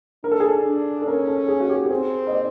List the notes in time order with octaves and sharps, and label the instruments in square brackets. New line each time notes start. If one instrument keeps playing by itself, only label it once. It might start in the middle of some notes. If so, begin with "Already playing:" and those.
[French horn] D4 [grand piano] A#4
[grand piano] A4
G#4
A4
[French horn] D4
[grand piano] A4
[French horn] C#4 [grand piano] A#4
[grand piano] A4
G#4
F#4
G4
G4
[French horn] C4 [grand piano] G#4
[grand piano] D#5
D5